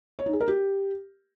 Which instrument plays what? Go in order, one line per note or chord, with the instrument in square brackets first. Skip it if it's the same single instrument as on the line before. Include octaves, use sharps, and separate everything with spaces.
[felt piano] C#5
D#4
G#4
A#4
G4